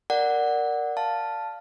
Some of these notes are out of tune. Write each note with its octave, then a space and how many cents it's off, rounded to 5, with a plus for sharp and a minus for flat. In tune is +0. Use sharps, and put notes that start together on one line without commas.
A#4 +0 D5 +0 F#5 +0
F5 +0 A5 +0